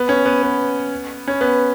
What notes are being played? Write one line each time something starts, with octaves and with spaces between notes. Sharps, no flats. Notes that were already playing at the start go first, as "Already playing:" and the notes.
Already playing: B3
C#4
B3
B3
C#4
B3